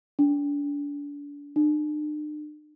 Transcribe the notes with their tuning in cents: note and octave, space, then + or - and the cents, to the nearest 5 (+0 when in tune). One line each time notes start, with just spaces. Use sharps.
D4 -35
D4 +45